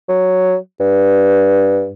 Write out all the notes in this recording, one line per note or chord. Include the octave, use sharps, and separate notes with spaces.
F#3
G2